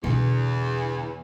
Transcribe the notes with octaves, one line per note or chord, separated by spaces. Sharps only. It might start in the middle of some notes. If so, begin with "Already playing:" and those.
E2 B2 D3